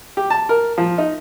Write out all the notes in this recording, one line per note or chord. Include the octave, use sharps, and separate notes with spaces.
G4
A5
A#4
F3
D#4